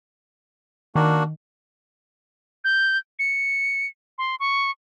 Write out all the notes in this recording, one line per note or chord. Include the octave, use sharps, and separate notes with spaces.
D#3 A#3 D4 F#4
G6
C#7
C6
C#6